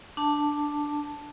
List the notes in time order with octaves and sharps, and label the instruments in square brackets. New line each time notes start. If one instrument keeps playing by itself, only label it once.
[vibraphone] D4 A5